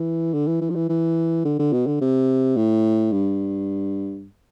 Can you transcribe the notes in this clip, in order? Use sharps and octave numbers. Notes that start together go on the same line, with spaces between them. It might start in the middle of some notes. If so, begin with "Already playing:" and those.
Already playing: E3
D3
E3
E3
F3
E3
E3
D3
D3
B2
D3
C3
A2
G2